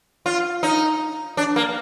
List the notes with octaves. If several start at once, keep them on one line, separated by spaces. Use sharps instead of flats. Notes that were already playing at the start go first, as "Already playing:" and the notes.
F4
D#4
D4
A#3